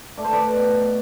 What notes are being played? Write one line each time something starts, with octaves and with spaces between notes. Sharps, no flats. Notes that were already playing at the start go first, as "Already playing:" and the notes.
A3 D5
C5
B4 D5
B2